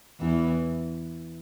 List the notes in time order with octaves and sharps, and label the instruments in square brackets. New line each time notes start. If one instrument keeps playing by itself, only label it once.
[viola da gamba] E2 E3